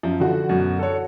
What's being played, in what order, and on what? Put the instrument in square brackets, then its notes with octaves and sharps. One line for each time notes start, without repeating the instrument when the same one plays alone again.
[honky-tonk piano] F#2 [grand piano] F3
[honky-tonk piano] D3 E3 F#4
[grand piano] F#2 B2
A4 C#5